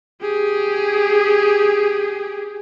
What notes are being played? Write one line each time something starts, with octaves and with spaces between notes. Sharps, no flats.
G4 G#4